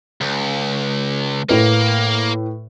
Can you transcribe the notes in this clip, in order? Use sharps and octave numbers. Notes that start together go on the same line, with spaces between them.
C#2
A2 A#3 B4